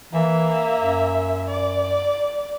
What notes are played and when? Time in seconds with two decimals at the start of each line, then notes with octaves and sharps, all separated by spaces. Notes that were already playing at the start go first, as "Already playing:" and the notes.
0.13 E3 A#3 E5
0.78 F#2
1.47 D5